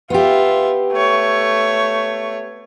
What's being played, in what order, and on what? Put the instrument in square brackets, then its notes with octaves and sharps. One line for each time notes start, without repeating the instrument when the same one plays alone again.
[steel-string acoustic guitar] B3 G4 [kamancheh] F4 E5
[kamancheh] A3 C#5